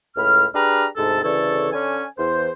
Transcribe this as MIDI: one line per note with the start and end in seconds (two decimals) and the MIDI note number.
0.17 0.45 37
0.17 0.45 45
0.17 0.45 83
0.17 0.45 89
0.54 0.85 62
0.54 0.85 67
0.54 0.85 68
0.54 0.85 71
0.54 0.85 82
0.54 0.85 89
0.97 1.23 38
0.97 1.23 44
0.97 1.23 48
0.97 1.23 69
0.97 1.23 81
1.23 1.69 38
1.23 1.69 49
1.23 1.69 52
1.23 1.69 69
1.23 1.69 73
1.23 1.69 74
1.73 2.04 50
1.73 2.04 61
1.73 2.04 80
2.18 2.50 40
2.18 2.50 72